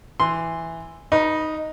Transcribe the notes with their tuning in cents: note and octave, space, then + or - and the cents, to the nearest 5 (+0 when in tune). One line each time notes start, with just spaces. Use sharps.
E3 +0 C6 +0
D#4 +0 B4 -25